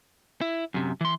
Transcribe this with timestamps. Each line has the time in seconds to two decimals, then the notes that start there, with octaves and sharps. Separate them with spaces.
0.41 E4
0.74 F#2 C3
1.01 E3 C6